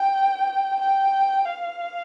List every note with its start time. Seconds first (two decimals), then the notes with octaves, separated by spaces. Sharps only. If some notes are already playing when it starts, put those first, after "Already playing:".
Already playing: G5
0.80 G5
1.45 F5